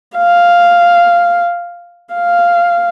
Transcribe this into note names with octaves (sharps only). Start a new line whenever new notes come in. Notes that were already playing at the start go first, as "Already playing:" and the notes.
F5
F5